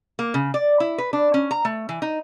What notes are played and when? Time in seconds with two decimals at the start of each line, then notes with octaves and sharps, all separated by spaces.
0.19 A#3
0.34 C#3
0.54 D5
0.80 E4
0.98 B4
1.13 D4
1.34 C#4
1.51 A#5
1.65 A3
1.89 E3
2.02 D#4